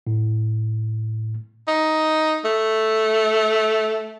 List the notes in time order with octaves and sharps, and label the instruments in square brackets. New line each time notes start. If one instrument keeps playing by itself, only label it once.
[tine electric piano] A2
[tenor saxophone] D#4
A3